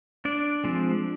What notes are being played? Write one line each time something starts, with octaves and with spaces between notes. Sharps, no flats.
D4 D5
F3 G#3 C4